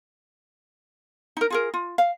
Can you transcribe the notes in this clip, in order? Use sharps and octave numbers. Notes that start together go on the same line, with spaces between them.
D#4 A#4
F4 G#4 A#4
F4
F5